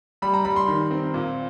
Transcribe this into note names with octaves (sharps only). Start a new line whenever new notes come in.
G3 B5
A#5
G3 B5
C6
D#3
C4
A#2